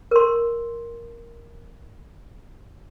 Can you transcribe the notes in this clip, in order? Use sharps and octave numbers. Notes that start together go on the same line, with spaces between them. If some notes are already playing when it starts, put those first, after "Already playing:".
A#4 C6